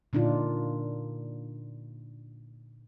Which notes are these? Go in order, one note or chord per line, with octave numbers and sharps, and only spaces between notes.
A#2 D3 D4 D#4 F4